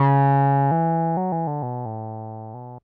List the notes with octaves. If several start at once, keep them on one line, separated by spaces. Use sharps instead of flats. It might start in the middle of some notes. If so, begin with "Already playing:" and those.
Already playing: C#3
E3
F#3
E3
D3
B2
A2
B2